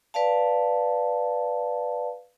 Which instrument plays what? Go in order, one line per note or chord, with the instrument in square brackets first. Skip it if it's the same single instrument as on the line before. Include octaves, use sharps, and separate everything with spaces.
[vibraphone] B4 D5 F5 A5